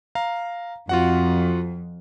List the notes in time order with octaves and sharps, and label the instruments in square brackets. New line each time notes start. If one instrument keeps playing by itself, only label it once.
[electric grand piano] F5 A#5
[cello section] F2 [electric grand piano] F4 F#4 F#5